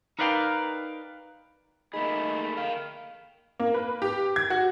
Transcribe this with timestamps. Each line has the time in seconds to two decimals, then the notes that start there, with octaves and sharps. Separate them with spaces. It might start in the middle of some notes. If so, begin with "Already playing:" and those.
0.19 D#4 A#4 B4 D5 F5 G5
1.94 A3 A#3 D#4 G#4 B5
2.57 A#4 F5 G5
3.60 A#3
3.74 B4
4.02 G4
4.36 G#6
4.50 F#4